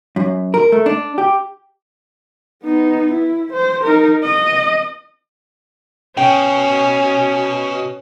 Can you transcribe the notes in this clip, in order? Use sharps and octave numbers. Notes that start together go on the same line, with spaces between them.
F#2
A#4
A3
D4
G4
B3 D#4
E4
C5
D#4 A#4
D#5
B2 C#4 G5